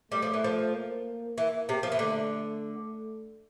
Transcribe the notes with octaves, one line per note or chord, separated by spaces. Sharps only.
G3 A3
F3
E3
F3
A#3
E3
C3
F3
E3
D3 A3